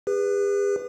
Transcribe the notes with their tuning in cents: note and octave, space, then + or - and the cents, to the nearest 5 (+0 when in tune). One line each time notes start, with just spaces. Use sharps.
G#4 -45 B4 +0